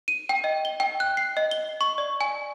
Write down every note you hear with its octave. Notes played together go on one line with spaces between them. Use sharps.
D#7
G5
D#5
G7
G5
F#6
C7
D#5
G7
C#6
D5
G#5